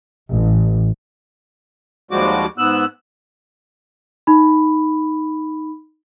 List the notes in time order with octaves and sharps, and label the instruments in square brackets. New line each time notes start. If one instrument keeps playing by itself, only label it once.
[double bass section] A1
[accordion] D#2 F3 G3 G#3 F#4 D6
G#2 B3 E6 F#6
[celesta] D#4 B5